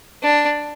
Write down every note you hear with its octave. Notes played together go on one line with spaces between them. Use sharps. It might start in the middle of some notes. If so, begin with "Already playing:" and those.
D4